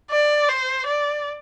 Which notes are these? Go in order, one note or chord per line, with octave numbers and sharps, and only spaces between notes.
D5
C5
D5